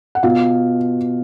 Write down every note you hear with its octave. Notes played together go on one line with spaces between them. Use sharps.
F#5
B2 F4 F5